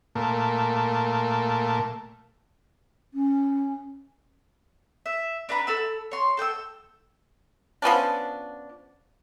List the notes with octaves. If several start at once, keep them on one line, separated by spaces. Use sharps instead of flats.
A#2 A3
C#4
E5
D4 B4 A#5 B5
A4 B5 E6
C#5 C6
A4 G5 D#6 E6
F3 B3 C#4 D4